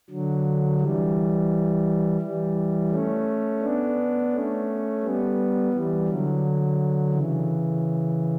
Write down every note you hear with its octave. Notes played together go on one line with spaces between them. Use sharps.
D3 F#3
E3 G3
E3 G3
A3 C#4
B3 D4
A3 C#4
G3 B3
E3 G3
D3 F#3
C#3 E3